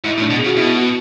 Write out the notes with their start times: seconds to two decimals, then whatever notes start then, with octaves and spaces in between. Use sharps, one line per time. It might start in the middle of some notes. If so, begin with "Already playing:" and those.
0.04 G#2 E4
0.18 A2
0.22 D4
0.30 B2
0.36 G#4
0.44 C#3 F#4
0.56 B2 E4
0.74 F#4